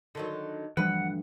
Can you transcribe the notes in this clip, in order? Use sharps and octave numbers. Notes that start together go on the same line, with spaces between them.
D3 D#3 F#3
D2 G2 E3 F3 G3 B4 F#5